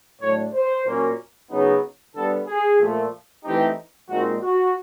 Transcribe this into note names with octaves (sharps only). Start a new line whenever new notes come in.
A2 F#3 A3 D4 C#5
C5
A#2 F#3 A#3 C#4
C#3 F#3 B3 D#4
D3 G3 B3 A4
G#4
A#2 F3 A3
E3 A3 C4 D#4 G4
A#2 F3 G#3 C4 D#4 F#4
F#4